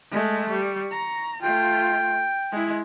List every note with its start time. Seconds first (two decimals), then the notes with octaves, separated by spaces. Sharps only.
0.11 G#3 A3
0.50 G3 C#6
0.91 A#5
1.42 A3 F4 G5
2.52 G#3 E4